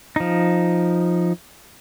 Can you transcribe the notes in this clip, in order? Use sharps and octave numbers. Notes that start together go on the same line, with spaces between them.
F3 D#4